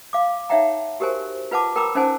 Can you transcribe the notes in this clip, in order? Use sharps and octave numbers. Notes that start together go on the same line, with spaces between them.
F5 D6
D#4 C#5 E5 F#5 G5 A#5
F#4 G4 A#4 C5 G#5
F4 B4 F#5 A5 D6
A#4 G5 A#5 B5 D6 E6
C#4 D#4 C5 F#5 G#5 A5